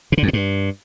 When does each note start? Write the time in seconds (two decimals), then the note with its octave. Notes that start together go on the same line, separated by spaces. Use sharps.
0.12 B2
0.18 D3
0.23 F2
0.28 C#3
0.33 G2